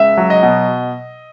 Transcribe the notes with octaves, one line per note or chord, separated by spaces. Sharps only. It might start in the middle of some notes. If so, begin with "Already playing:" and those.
Already playing: C#2 E5
F#3
D#5
B2